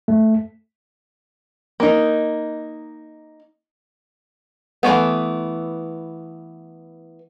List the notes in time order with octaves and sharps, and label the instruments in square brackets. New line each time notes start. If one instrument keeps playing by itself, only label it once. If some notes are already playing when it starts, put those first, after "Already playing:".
[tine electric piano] A3
[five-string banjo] A#3 D#4
E3 G#3 A3 B3